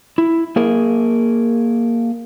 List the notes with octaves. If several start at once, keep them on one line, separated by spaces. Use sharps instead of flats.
E4
A#3 G#4 A#4